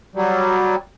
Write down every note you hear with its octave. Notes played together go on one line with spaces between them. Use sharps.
F#3 G3